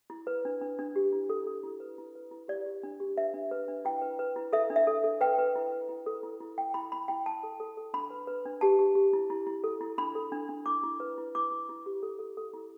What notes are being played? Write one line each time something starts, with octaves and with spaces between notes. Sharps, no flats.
E4
B4
D4
D4
D4
G4
E4
A4
A4
E4
B4
E4
B4
E4
G4 D5
G4
D4
G4
B4 E5
D4
B4
D4
E4 G5
B4
B4
E4
A4 E5
D4
E5
A4
A4
B4 G5
B4
E4
B4
E4
A4
E4
E4
E4 G5
E4 B5
E4 B5
E4 G5
E4 A5
A4
A4
A4
D4 B5
B4
B4
D4
G4 A5
G4
G4
E4
E4
E4
A4
E4
D4 B5
A4
D4
D4
E4 D6
E4
B4
E4
E4 D6
E4
E4
G4
A4
A4
A4
E4